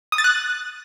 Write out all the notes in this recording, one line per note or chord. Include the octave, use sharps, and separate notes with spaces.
D#6
A6
F#6